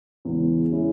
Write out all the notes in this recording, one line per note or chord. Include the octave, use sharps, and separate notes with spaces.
E2 C#3 G#3
G#3 C#4 E4